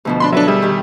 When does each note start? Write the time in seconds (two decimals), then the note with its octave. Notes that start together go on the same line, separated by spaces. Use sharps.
0.05 D2 B2 F3
0.20 D4 B5 C6
0.32 F#3 D4 A4 B4 E5
0.47 G3 G#4 E5
0.62 D#3 G4